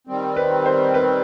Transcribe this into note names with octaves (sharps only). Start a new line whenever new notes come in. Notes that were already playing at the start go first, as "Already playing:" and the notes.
D#3 G3 C4
B4
C5
B4